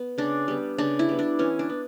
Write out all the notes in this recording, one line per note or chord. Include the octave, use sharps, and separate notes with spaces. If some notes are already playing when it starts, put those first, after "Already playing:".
Already playing: B3
C#3 D4
G3 B3
C#3 D4
E4
G3 B3
D4
E3 C#4
D4
B3